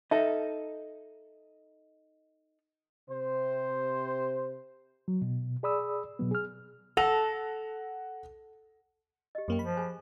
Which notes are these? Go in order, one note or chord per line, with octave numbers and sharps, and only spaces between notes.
D#4 A4 E5
C3 C5
F#3
B2
G#4 D5 B5 D#6 E6
B2 F#3 B3
G#4 F6
A4 F#5 A#6 F7
G4 D#5
F#2 A#3 G4 G5
F3 B5
G#4 C5 G#5